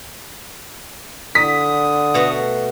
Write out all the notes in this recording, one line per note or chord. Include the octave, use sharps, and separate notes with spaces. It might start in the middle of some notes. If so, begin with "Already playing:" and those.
D3 D#6 B6
B2 A3 F#4